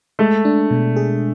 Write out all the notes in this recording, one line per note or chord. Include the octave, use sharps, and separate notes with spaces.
G#3 A3
D4
B2
G#4